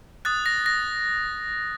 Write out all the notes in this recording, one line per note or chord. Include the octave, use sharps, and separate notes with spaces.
D#6 F#6 A6
A#6
A#6